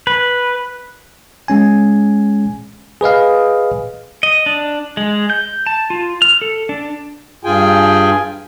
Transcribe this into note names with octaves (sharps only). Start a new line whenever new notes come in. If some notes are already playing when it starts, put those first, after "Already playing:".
B4
G#3 C#4 G#5
G#4 B4 D#5 F5
D#5
D4
G#3
G6
A5
F4
F6
A4
D4
G2 F4 G#4 G5 G#5